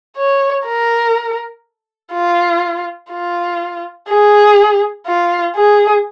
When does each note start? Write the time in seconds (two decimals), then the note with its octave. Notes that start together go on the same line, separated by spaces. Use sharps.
0.17 C#5
0.66 A#4
2.13 F4
3.11 F4
4.09 G#4
5.07 F4
5.56 G#4